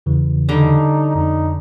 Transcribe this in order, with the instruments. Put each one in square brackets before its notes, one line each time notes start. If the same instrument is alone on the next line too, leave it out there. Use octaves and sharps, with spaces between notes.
[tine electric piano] E2 C#3 E3
[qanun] D3 G3 A#5 [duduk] D#4
[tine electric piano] F2 [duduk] D#4